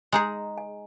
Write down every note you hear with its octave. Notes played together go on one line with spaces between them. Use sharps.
G#3 D#4 G#4 A#5
G#5